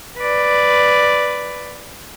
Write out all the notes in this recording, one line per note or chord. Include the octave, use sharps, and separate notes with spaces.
B4 D5